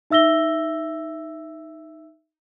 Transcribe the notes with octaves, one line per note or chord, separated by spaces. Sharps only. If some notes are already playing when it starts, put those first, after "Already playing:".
D#4 E5 E6 A#6 G7